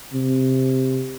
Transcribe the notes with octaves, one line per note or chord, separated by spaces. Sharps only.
C3